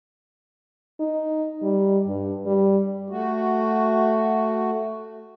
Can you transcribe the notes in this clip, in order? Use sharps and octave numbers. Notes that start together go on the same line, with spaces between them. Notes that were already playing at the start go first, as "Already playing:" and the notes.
D#4
G3
G2
G3
A3 F#4